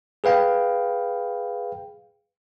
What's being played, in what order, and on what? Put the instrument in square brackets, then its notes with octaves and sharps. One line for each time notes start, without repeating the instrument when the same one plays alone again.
[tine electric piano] G#4 B4 F5 G5